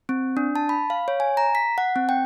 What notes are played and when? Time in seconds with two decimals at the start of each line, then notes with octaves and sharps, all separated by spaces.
0.09 C4
0.37 D4
0.56 A5
0.69 B5
0.90 F5
1.08 C#5
1.20 G#5
1.37 A#5
1.55 B6
1.78 F#5
1.96 C4
2.09 G5